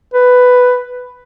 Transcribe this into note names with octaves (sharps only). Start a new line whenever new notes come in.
B4